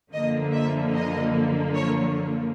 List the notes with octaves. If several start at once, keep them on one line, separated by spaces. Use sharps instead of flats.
F#2 D3 F3 A#3 D#5
E5
D#5
C#5